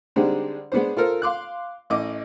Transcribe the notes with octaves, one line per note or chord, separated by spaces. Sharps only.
D3 G3 G#3 C4 D4 D#4
G#3 B3 D4 C5
F4 A4 A#4 C5
F5 C6 D6 F#6
A1 D#5 D6